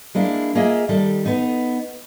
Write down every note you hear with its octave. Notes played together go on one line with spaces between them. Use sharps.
G#3 A#3 D4 E4
A#3 F4 G#4 D#5 E5
D#3 G3 A4
B3 D#4